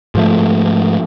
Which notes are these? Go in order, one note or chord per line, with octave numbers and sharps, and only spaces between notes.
G#2 F3 A3